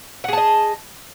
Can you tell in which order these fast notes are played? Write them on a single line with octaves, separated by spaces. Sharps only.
F#5 G#4 A5 D#5